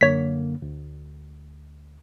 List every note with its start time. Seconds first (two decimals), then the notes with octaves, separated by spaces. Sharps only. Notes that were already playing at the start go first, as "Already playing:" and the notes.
0.01 F#2 D3 A#3 C#5 B6
0.62 D2